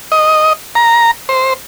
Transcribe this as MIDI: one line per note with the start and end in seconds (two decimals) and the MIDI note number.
0.12 0.53 75
0.75 1.11 82
1.29 1.54 72